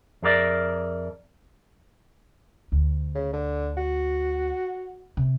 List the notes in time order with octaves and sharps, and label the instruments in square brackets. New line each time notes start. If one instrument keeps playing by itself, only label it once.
[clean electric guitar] F2 G#4 A#4 D5 E5
[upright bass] D2
[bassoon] C#3
D3
F#4
[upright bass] C3